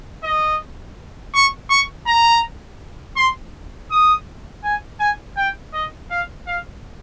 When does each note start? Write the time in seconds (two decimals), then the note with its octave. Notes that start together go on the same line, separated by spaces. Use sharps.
0.24 D#5
1.35 C#6
1.70 C#6
2.07 A#5
3.17 C6
3.91 D#6
4.64 G#5
5.00 G#5
5.37 G5
5.73 D#5
6.10 F5
6.47 F5